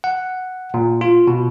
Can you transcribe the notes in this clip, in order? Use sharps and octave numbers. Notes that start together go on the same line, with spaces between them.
F#5
A#2
F4
B2